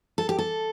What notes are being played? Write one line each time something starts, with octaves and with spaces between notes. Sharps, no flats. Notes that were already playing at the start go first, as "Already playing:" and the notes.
A4
G4
A4